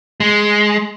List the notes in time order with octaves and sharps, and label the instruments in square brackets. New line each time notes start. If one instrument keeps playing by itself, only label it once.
[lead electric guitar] G#3